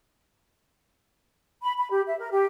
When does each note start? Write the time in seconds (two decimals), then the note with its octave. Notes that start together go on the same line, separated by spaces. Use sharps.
1.62 B5
1.78 B5
1.90 G4
2.07 E5
2.19 A#4
2.31 G4